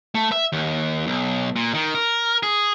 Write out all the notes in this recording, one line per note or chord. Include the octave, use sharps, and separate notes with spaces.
A3
E5
D#2
B1
A#2
D#3
A#4
G#4